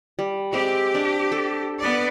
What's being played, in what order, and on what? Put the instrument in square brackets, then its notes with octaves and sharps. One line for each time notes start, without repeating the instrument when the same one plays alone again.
[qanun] G3
[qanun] G#3 C4 [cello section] G4
[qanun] D4
A4
[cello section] B3 D5